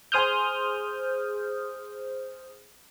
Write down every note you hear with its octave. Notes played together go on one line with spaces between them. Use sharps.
G#4 C5 D#6 F6 G6